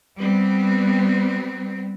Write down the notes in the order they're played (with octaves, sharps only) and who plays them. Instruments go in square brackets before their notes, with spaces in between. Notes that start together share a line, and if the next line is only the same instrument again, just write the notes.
[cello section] G3 B3 C4